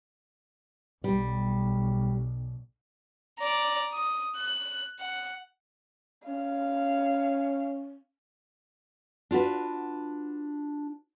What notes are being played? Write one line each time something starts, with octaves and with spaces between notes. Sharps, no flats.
B1 G3
D5 A#5
D#6
F#6
F#5
C#4 F5
D4 F4 F#4 B4